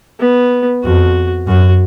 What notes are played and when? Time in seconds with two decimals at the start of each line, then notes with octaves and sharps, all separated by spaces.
0.20 B3
0.84 F2 F#4
1.47 F#2 F#4